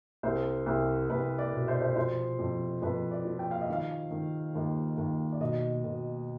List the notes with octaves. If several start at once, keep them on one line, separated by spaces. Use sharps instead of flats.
C2 C5
C2
C2 B4
D5
B2
C5
D5
C5
F3 C5
F2
F2 B4
D5
F3
G5
F5
D#5
D#3 F5
D#3
D#2
D#2
D5
B2 D#5
B2